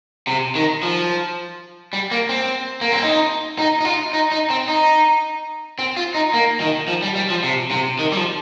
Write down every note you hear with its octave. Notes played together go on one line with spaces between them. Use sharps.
C3
D#3
F3
G3
A#3
C4
A#3
C4
D#4
D#4
D#4
F4
D#4
D#4
C4
D#4
C4
F4
D#4
A#3
D#3
F3
G3
G3
F3
C3
C3
D#3
G3
F3